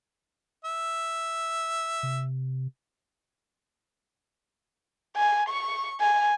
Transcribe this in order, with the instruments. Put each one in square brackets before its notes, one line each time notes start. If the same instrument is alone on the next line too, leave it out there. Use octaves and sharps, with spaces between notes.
[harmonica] E5
[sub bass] C3
[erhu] G#5
C#6
G#5